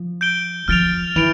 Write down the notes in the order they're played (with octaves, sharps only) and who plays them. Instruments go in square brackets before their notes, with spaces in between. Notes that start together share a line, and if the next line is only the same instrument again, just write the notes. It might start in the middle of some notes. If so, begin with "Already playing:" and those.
Already playing: [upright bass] F3
[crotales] G6 D7 G7
[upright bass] F3 [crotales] F6 A6 D7 F7
[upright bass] E3 [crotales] D7 F7